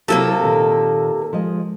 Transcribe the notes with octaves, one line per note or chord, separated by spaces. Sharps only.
C3 F#3 A#3 E4 G4 A4
A#2 D#3
F3 G#3 D#5